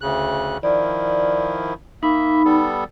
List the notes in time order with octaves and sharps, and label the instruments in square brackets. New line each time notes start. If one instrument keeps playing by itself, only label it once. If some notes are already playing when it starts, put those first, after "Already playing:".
[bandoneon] D2 C#3 F#6
[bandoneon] D#3 F3 E4 [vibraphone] D5
[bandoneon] A#3 E5 [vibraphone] D#4 B5
[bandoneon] G3 B3 A4